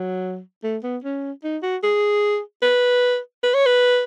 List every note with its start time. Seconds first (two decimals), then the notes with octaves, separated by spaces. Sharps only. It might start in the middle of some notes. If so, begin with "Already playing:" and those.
Already playing: F#3
0.63 A3
0.83 B3
1.04 C#4
1.44 D#4
1.63 F#4
1.83 G#4
2.62 B4
3.43 B4
3.54 C#5
3.66 B4